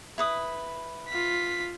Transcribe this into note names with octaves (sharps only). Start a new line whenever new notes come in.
E4 B4 D#6
F4 B6